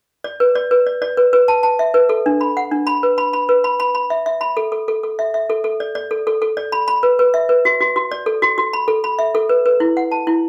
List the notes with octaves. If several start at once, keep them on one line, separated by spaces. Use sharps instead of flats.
D5
B4
D5
B4
D5
D5
B4
B4
A5
A5
E5
B4
A4
D4
B5
F#5
D4
B5
B4
B5
B5
B4
B5
B5
B5
E5
E5
B5
A4
A4
A4
A4
E5
E5
A4
A4
D5
D5
A4
A4
A4
D5
B5
B5
B4
B4
E5
B4
F#4
F#4
F#4
D5
A4
F#4
F#4
B5
A4
B5
E5
A4
B4
B4
E4
F#5
A5
E4